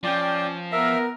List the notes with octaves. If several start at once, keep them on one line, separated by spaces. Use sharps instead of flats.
F3 C#4 D5 G5
B3 A#4 E5